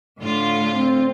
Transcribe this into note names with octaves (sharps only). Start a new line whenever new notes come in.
A2 D3 F4
C4